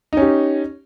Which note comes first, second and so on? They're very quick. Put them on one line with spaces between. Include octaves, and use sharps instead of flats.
D#4 C#4 G4